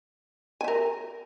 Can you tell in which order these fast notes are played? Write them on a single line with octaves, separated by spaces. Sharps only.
G#5 E5 A#4